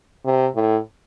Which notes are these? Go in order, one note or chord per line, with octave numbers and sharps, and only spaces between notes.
C3
A2